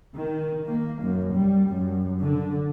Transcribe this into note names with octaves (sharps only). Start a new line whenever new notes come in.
D#3
A#3
F#2
G3
F#2
D3